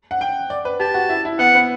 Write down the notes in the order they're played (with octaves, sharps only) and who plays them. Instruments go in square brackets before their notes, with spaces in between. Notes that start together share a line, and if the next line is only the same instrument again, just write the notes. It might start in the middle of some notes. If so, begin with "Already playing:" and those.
[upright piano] F#5
G5
D5
B4
[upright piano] G4 [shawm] A5
[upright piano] F#4
E4
E4
[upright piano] B3 [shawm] F#5
[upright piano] B3